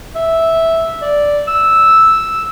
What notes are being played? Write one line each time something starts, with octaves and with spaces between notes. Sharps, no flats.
E5
D5
E6